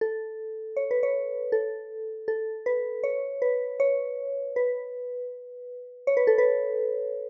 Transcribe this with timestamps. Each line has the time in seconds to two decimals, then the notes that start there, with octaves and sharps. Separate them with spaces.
0.01 A4
0.77 C#5
0.91 B4
1.03 C#5
1.52 A4
2.28 A4
2.66 B4
3.04 C#5
3.42 B4
3.80 C#5
4.56 B4
6.07 C#5
6.17 B4
6.27 A4
6.38 B4